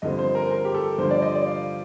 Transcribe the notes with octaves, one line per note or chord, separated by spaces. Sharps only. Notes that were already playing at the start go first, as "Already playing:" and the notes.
G2 D3 F3 C4 D#5
C5
A#4
C5
A#4
G4
A4
G2 D3 F3 C5
D5
D#5
D5
F5